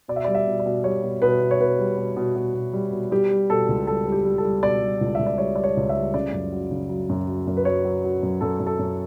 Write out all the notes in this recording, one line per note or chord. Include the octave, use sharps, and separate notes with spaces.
B2 D5
E5
G3 D5
E5
B2
D5
B2
G3 C#5
B2
B2 B4
B2
C#5
B2 B4
G3
B2
B2
B2
B2
G3
B2
G3 G4
G3
B2 A4
C#2
G3 A4
G3
G4
G3
A4
G3
B2 D5
G3
C#2
C#2 E5
D5
G3 C#5
G3 D5
C#5
C#2
E5
G3
C#3 D5
F#2
F#3
C#3
F#3
F#2
F#3
F#2
B4
F#3 C#5
F#3
F#3
F#2
F#2 A4
F#2
A4
F#2